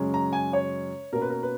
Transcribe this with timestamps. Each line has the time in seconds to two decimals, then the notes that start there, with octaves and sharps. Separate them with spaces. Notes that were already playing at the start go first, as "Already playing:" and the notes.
Already playing: F#2 C#3 G#3 C#4
0.14 A#5
0.33 G#5
0.53 C#5
1.13 B2 A#3 C#4 A#4
1.22 B4
1.30 A#4
1.43 B4